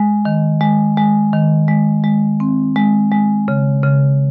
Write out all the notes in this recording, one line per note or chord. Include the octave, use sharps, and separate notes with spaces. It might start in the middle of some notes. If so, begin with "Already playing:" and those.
Already playing: G#3
D#3
G#3
G#3
D#3
G#3
G#3
C4
G#3
G#3
C#3
C#3